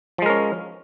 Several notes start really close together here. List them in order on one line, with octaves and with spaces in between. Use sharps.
F3 G#3 A#4 C#4